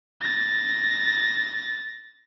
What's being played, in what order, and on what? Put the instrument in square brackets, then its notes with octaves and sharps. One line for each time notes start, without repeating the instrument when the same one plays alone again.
[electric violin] A6 A#6